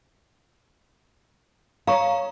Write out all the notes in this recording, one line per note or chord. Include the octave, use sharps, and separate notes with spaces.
C#5 F5 A#5 C#6